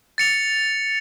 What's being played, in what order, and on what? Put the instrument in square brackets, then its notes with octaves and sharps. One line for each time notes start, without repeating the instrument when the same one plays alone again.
[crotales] A6 C#7 F7